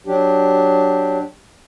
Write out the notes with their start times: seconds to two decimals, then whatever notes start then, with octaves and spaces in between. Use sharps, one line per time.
0.07 F#3 D4 G4